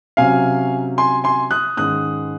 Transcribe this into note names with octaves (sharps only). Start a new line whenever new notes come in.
C3 F#3 C#4 F5 G#5
G#5 C6
G#5 C6
D#6 F#6
G#2 D#3 G#3 C#4 D#6 F#6